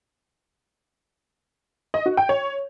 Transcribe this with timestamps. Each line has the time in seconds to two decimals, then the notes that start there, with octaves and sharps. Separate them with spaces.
1.94 D#5
2.06 F#4
2.17 G5
2.29 C#5